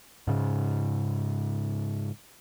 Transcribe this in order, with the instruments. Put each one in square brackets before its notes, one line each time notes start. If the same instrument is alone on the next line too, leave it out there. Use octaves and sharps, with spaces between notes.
[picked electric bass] G#2 C#3